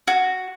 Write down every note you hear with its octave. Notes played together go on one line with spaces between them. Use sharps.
F#4